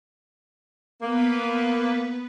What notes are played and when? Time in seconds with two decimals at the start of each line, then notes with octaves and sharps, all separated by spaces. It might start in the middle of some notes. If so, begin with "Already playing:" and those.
1.02 A#3 B3 B4